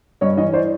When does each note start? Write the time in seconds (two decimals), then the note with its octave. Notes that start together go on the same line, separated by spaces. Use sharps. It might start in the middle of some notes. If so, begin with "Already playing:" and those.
0.21 G2 C#5 D#5
0.37 E3 C#5 D#5
0.53 C5 D5